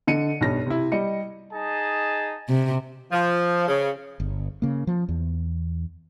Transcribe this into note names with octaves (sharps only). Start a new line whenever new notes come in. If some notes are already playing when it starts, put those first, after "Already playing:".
D3 D#5 C#7 D#7
B1 G2 A#6
C3 E4
G3 D#5 C#7
D#4 G#4 A5
C3
F3
C#3
G1
C#3 A#3
F3
E2